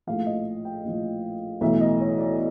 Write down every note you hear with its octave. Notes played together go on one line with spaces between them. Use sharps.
A#1 A2 F3 F5
D#5
G5
A#1 A2 F3
B1 A2 E3 E5
D#5
C#5
D5